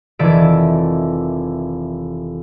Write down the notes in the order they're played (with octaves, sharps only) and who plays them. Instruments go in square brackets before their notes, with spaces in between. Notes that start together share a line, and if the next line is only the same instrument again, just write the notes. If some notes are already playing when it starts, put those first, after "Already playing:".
[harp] F1 D#3 E3 D5 E5 D7